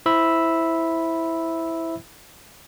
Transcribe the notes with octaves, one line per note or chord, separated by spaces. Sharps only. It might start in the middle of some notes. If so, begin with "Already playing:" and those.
E4 C5 E5 B5 E6